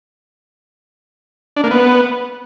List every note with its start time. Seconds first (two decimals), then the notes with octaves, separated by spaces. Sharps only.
1.57 D4
1.64 A#3
1.71 B3